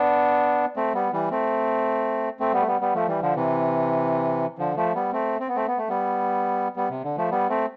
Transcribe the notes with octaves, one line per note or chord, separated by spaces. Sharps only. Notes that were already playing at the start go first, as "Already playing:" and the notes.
Already playing: B3 D4
A3 C4
G3 B3
E3 G3
A3 C4
A3 C4
G3 B3
A3
G3 B3
G3 B3
F3 A3
E3 G3
D3 F3
C3 E3
D3 F3
F3 A3
G3 B3
A3 C4
C4
B3
A3 C4
B3
A3
G3 B3
G3 B3
C3
D3
F3 A3
G3 B3
A3 C4